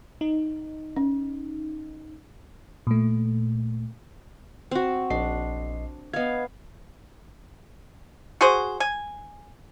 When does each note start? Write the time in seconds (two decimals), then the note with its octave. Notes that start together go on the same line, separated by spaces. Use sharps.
0.21 D#4
0.96 C#4
2.87 A#2 A3
4.71 C4 F#4
5.10 A#1 D4 D#5 C7
6.13 B3 D#5 F5 G#6
8.41 F#4 G#4 C5
8.80 G#5